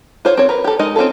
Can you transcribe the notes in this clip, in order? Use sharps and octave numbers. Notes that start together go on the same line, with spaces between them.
F4 C5 C#5
C4 C#5
A#4 B4
G4 A4
G#3 D#4 A#4 D#5
C4 C#4 F4 A4